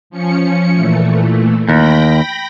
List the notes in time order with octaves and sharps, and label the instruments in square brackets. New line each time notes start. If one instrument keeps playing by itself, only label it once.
[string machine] F3 C#4 C#7
A#2 E3 A3
[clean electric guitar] D#2 [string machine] G5 B5 A#6